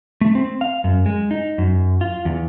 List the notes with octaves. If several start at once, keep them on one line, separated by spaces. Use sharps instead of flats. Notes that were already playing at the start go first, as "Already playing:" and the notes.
A3
C4
F5
F#2
G#3
D#4
F#2
F4
E2